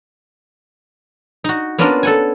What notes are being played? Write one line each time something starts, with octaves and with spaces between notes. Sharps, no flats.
D#4 F#4
A#3 B3 C#4 D4 F4 A#4
A4 F#5 G#5